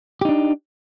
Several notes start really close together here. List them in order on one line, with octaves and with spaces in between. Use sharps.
G4 D#4 D4